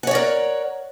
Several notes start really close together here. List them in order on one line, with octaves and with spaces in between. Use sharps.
F#5 C#5 D5 A#4